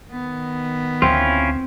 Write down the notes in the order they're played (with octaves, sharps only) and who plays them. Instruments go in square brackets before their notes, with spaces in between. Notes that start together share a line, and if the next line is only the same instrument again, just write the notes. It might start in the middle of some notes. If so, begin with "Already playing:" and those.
[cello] D#3 B3
[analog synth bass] D2 [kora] C4 [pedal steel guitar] C#4 E4 F4